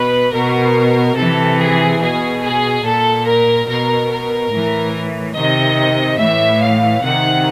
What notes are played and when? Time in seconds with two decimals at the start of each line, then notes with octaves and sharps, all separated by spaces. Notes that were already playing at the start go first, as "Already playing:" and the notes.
Already playing: B2 B4
0.32 B2 A#4
1.16 C3 E3 A4
1.59 G#4
2.00 B2 G#4
2.42 G#4
2.84 A#2 A4
3.26 A#4
3.68 B2 A#4
4.10 A#4
4.51 A2 E3
5.35 C3 D#3 D#5
6.19 A2 E3 E5
6.61 F5
7.02 C3 D#3 F#5